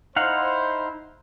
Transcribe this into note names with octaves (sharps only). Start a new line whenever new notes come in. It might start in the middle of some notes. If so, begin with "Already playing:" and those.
D#4 E4 C5 F5 F#5